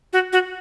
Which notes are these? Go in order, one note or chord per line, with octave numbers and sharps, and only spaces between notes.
F#4
F#4